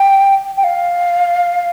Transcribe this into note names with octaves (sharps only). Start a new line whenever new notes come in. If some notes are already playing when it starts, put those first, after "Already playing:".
Already playing: G5
G5
F5